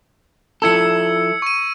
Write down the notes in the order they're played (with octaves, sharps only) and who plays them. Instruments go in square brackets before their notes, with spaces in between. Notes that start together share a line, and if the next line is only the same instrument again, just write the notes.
[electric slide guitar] F3 E4 A4 [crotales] E6 G#6 C#7
[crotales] C#6 D#7